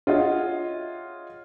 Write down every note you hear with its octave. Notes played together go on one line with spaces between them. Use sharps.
F4 G#4 C#5 D#5 E5 F#5